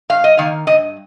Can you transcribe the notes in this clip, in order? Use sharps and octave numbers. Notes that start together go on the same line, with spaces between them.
G2 F5
D#5
D#3 A#3 F5
G2 D#5